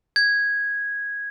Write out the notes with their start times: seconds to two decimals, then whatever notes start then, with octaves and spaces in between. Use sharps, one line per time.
0.16 G#6